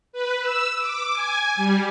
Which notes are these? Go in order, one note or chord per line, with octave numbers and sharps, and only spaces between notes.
B4
E6
D6
G#5
G3